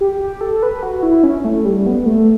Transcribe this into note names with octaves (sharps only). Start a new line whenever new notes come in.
G4
G4
A4
B4
F#4
E4
C#4
A3
G3
B3
A3